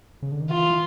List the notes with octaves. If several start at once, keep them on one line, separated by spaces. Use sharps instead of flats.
C#3
D3
D#3
E3 F4
E3